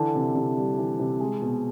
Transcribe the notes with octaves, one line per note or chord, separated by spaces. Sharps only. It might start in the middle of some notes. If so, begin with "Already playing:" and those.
Already playing: D3 E3 A5
C3
C3
G3
E3
C3
G#3
B2